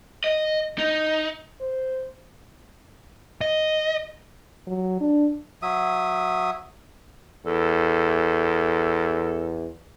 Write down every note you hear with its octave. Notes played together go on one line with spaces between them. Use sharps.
D#5
D#4
C5
D#5
F#3
D4
F#3 E5 D#6
E2 A4